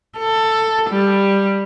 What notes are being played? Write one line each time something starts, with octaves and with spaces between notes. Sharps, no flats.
A4
G3